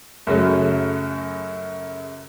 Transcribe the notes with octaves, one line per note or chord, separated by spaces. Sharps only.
F#2 C#3 F#3 A3